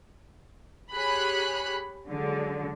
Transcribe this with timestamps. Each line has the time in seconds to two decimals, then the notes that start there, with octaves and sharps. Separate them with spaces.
0.94 G4 G#4 C#5 B5 F#6
2.09 D3 F#3 G#3